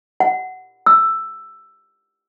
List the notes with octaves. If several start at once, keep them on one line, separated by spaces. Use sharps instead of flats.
F#5
E6